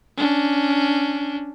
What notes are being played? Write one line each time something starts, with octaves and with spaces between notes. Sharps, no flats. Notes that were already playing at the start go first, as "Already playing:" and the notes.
C#4 D4